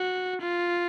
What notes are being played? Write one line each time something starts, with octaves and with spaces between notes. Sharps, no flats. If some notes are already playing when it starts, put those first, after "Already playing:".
Already playing: F#4
F4